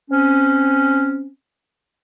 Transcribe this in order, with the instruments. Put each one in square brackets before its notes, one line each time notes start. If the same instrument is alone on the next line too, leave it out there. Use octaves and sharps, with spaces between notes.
[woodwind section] C4 C#4